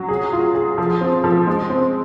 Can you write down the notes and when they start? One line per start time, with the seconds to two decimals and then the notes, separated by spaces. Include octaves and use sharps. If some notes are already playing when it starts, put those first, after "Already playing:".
Already playing: F#3
0.09 G#4
0.33 F4
0.55 G#4
0.78 F3
1.01 C4
1.24 F3
1.47 G#3
1.70 C4